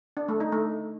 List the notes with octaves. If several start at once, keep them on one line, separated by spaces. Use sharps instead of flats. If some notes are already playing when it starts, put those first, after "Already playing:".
D4
A3
D#4
A3